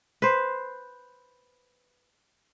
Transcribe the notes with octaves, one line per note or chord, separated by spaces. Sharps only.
B4 C5